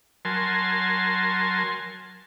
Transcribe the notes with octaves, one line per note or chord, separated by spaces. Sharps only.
F#3 A#4 G#5 A5 C6